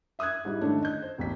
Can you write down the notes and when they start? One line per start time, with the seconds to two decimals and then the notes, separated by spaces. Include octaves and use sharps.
0.19 E5 D#6 E6 F#6 G#6
0.45 G#2 G3 E4
0.61 D3 D#3 A3 C#4 D4
0.83 D#5 G6
1.02 C5
1.18 E1 A1 B6